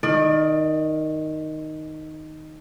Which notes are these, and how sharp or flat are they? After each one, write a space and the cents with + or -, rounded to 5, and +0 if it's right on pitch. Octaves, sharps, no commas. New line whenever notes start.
D#3 +0 D5 +30